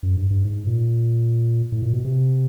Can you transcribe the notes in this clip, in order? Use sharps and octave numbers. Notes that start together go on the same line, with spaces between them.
F#2
G2
G2
G#2
A#2
A2
A#2
B2
C3